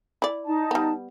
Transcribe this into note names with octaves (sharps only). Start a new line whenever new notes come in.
E4 D5
D#4 A5
G3 B3